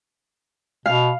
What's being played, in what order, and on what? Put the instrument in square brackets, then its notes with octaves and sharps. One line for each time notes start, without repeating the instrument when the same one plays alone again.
[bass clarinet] B2 [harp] F5